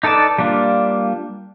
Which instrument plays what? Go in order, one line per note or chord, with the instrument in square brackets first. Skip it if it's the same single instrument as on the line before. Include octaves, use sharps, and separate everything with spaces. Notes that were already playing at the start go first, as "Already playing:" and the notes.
[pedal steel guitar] D#4 A4 B4 D5 A5
G3 A#3 D4 F4